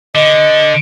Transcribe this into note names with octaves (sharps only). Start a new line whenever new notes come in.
D3 D#5